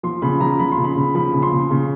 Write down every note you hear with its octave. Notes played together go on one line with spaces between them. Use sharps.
F3 C6
C#3 B5
F3 A#5
F3 B5
C6
C#3
B5
C#3
F3 B5
C#3
C6
C#3
C#3